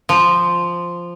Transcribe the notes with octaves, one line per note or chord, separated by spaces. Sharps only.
F3